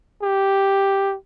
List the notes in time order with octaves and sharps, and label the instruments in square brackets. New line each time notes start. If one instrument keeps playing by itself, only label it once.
[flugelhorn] G4